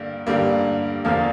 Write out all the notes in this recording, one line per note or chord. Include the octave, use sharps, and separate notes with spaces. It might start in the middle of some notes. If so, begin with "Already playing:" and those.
Already playing: G2 D3 A#3
G2 D3 G3 A#3
E2 D3 F3 A#3 F5